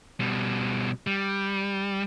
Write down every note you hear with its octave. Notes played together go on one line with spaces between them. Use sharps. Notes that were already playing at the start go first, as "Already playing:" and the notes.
B2 G3
G3